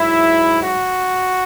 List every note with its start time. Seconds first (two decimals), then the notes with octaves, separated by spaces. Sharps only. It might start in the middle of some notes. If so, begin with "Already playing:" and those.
Already playing: G#2 F#3 E4
0.61 F#4